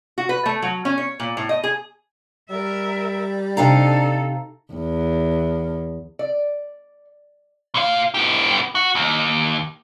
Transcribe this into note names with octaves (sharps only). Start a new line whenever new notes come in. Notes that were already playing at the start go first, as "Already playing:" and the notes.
F#4
B4
A3
F#3
C#4
C#5
A#2
A2
D#5
G#4
G3 A#4 E5
C3 D4 D#4 A4 F5 A#5
E2
D5
A#2 F5
B3 G4
F#4
D#2